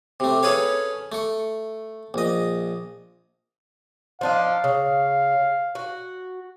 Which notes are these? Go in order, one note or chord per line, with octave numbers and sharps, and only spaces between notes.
C3 A3
C#4 G#4 A4 B4 C#5 F5
A3 C#6
A#1 D#5
F3 D4 D#4 F5
C#3
F#4